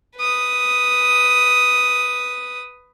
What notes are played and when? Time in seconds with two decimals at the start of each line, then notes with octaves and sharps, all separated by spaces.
0.18 B4 D#6